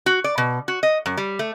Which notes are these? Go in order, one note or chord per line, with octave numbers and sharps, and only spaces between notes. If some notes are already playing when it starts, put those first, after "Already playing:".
F#4
D5
B2
F#4
D#5
F#2
G3
A3